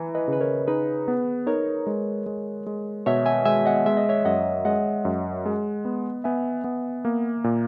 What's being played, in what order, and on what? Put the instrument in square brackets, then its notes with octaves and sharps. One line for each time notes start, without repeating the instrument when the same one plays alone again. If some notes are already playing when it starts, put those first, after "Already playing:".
Already playing: [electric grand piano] E3 [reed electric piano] E5 G#5 A#5
[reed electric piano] B4 D#5
[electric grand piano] C#3
[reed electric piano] B4
A#4 C#5
[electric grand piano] D#4 [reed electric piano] G#4 B4
[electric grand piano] B3
[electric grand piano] D#4 [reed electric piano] A#4 C#5
[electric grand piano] G#3
G#3
G#3
[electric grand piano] B2 [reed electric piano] C#5 E5
[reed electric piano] E5 G#5
[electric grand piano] G#3 [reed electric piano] E5 G#5
[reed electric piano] D#5 F#5
[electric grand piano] G#3 [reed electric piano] E5
[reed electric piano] D#5
C#5 E5
[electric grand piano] F#2 [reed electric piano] D#5 F#5
[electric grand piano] G#3 [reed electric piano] D#5 F#5
[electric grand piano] F#2
G#3
B3
[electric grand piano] B3 [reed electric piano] E5 G#5
[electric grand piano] B3
A#3
A#2